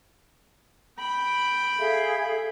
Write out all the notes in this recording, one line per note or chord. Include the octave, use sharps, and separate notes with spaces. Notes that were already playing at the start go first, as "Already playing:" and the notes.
G5 B5
G#4 A4 E5 F5